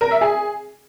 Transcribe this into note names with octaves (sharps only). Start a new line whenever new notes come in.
A#4
E5
G#4